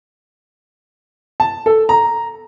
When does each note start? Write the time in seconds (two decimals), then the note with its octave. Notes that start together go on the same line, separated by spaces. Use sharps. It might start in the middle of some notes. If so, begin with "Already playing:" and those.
1.40 A5
1.66 A4
1.89 A#5